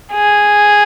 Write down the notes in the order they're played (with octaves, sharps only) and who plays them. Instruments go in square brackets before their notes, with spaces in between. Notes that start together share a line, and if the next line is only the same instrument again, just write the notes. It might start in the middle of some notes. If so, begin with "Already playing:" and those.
[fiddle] G#4